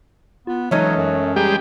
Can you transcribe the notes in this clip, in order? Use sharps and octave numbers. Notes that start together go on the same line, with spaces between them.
B3 F4
E3 F#3 G#3 A3 C#4 D#4 D#5
F#2
G3 G#3 G4 A#5